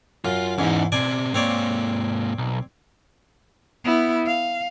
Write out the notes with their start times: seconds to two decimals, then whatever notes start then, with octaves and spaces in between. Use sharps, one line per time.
0.25 F#2 F4
0.59 E2 G#2 C#4 D#4
0.92 B2 C4 D5 G#5
1.34 G#2 A#3 C4 C#5 D5
2.38 B1
3.84 B3 E4
4.26 F5